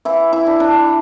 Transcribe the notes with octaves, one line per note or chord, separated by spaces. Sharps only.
E3 E4
E4
D4
D4